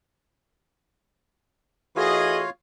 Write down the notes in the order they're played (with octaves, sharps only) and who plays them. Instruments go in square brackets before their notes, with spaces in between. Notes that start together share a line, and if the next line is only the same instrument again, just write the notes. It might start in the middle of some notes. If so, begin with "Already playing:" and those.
[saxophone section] E3 A3 F#4 [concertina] F4 C#5 F5 [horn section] G#4 D#5